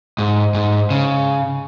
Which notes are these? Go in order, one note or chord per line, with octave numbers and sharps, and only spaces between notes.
G#2
G#2
C#3